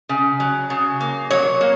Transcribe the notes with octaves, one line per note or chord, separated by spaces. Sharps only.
C#3
F#3
C#3
A#3
F#3 C#5
A#3